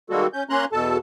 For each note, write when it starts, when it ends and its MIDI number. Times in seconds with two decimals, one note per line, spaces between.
0.10 0.27 51
0.10 0.27 55
0.10 0.27 56
0.10 0.27 58
0.10 0.27 66
0.10 0.27 69
0.33 0.44 61
0.33 0.44 91
0.50 0.65 58
0.50 0.65 61
0.50 0.65 82
0.50 0.65 84
0.50 0.65 90
0.72 0.98 40
0.72 0.98 47
0.72 0.98 69
0.72 0.98 81